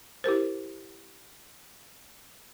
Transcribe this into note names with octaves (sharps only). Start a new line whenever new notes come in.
E4 G4 A#4 C5